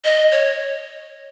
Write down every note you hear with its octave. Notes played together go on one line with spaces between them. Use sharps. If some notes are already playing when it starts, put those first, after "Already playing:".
D#5
C#5